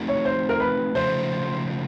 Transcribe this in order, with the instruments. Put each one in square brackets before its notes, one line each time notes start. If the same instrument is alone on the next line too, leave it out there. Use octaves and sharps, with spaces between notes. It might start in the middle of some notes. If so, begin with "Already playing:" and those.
Already playing: [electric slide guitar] A3 C4 D#4 F#4 A4
[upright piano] C#5
C5
A#4
B4
[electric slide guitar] C#3 F3 A3 [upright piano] C5